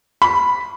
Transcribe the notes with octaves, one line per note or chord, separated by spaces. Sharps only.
B5